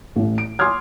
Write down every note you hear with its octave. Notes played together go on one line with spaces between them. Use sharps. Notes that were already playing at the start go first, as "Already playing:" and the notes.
A1 A2
D7
G#5 C6 D6 D#6 F6 G#6